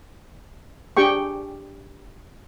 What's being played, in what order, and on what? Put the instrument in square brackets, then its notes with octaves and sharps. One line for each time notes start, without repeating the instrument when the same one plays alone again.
[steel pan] D4 G4 G#4 G5 C#6